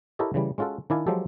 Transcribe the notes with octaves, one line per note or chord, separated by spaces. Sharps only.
E4 G4 A4 A#4 C#5 D#5
C#3 E3 G3
G#3 C#4 F4 F#4 A4
D#3 D4 E4 D5 F5 G#5
F3 F#3 G#3 G4 A4